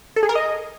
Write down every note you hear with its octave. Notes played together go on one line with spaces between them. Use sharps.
A4
G#4
A#4
D#5